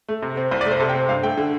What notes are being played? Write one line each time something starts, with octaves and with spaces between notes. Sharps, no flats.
A3
C3
C4
C2 C5
D5
A3
C5
C3 A4
G5
C4
G2 F5
A3 G5
D3